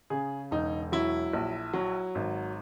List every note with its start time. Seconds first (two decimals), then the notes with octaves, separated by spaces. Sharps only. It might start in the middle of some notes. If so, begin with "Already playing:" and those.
0.10 C#3 G#4
0.51 E1 D#4
0.92 F#3 E4
1.33 A#1
1.73 F#3
2.15 G#1